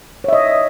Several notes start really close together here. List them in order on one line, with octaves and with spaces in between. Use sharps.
C#5 E5 D#5